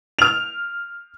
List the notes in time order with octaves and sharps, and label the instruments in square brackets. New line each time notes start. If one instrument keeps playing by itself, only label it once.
[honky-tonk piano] F6 F7